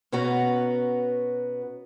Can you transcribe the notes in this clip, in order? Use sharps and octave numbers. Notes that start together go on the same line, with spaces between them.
B2 B3 C#4 F#4 A#5